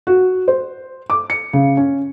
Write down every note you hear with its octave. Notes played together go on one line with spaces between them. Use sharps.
F#4
C5
D6
C#7
C#3
C#4